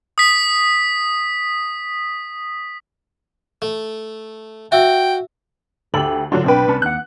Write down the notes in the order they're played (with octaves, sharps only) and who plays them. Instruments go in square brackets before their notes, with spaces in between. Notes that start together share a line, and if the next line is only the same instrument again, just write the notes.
[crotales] D#6 B6
[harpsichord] A3
[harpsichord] F#4 [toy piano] E5 E6 [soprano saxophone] G5
[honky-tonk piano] D2 F#7 [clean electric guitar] G4 A4
[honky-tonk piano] D3 F#3 D4 [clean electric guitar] F4 F#4
[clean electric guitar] B1 G5 [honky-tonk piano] C4 D4 B4
[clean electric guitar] C2 C#4 A5
[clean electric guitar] D#2 F#5 [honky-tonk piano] F#6